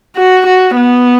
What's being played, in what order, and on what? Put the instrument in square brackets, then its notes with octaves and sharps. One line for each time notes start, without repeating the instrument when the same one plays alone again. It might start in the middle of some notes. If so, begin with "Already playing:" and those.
[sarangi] F#4
F#4
B3